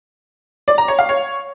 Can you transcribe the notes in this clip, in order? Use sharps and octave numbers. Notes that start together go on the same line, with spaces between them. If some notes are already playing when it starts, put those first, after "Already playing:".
D5
A#5
C#5
F5
C#5